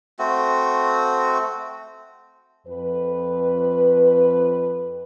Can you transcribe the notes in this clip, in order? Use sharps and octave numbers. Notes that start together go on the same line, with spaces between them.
A3 C4 F#4
F2 B4